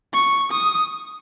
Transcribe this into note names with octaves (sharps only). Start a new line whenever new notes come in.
C#6
D#6